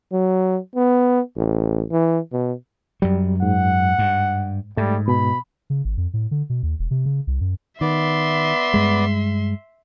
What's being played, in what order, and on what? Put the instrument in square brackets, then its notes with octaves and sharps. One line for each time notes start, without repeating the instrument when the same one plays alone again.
[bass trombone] F#3
B3
A1
E3
B2
[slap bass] F#2 F#3 [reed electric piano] G3
[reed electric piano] G#2 [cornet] F#5
[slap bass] G2
[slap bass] G#2 [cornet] G3 [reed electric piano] A3
[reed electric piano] B2 [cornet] B5
[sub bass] C#3
G#1
F2
A2
D3
B2
D#2
E1
C3
C#3
C2
F#2
[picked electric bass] D#3 [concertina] B3 D5 [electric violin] E5 C6
[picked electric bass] G2 G#3